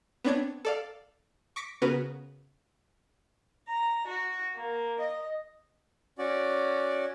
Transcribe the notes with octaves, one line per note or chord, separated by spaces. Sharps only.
B3 C4 D4 C#5 D6 G#6
A4 D5 F5
C#6 D6 A#6 B6 C#7 D7
C#3 B3 C#4 F#4 A#4 B4
A#5
F#4
A#3
D#5
C#4 F#4 D5